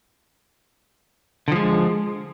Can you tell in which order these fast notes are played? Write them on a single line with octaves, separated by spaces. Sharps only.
D3 F3 G#3